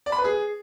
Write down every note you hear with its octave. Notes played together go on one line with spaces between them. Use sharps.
D5
B5
B4
G#4